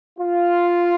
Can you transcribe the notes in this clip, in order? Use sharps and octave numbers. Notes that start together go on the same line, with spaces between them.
F4